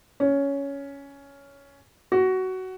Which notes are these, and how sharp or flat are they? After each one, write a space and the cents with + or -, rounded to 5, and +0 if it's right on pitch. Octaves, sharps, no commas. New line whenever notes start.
C#4 +10
F#4 +15